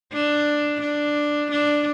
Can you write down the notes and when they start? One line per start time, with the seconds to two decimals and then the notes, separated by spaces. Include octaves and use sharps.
0.13 D4
0.81 D4
1.51 D4